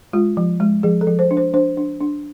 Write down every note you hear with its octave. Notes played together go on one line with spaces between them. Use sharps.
G#3 F4
F3
G#3
F3 G#4
A4
F3
C5
D4
C5
D4 C5
D4
D4